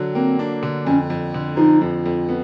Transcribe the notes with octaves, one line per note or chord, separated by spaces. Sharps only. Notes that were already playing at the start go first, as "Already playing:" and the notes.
Already playing: D3 F#3 D4
A#3 C4
D4
D3
F2 C#4
F2
D3
F3 D#4
F2
F2
B3